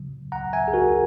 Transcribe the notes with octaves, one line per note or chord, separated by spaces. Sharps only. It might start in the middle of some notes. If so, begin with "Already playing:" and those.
Already playing: C#3 F#3
C#2 F#5 A#5
E5 G#5
G#4
C#2 F#4 A#4